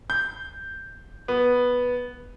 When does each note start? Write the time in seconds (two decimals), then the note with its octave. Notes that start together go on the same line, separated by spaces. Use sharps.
0.10 G6
1.28 B3